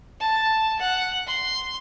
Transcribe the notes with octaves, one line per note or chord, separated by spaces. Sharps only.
A5
F#5
C6